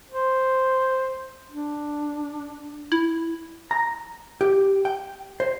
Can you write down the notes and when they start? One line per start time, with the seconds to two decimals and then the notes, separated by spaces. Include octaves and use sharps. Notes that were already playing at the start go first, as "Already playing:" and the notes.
0.11 C5
1.51 D4
2.92 E4
3.71 A#5
4.41 G4
4.85 G5
5.40 C5